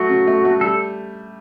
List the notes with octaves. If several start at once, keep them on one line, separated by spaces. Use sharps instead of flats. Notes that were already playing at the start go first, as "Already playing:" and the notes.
Already playing: F#3 A3 F#4
C#3
A3
A3
G3 A4